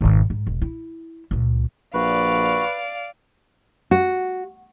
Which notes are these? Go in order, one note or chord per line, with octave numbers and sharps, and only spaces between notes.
G#1 B2
G#2
E1
E4
C#2 A#2
A#1 F#4 B4 D5 F5
F#4